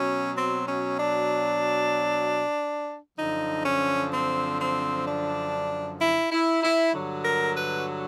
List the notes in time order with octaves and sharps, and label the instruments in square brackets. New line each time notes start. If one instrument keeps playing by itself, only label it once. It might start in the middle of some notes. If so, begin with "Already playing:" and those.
Already playing: [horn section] B2 F#3 C#4
C4
C#4
D4
F#2 D3 F3 D#4
C#4
C4
C4
D4
E4
E4
E4
G2 D3 F#3
A#4
B4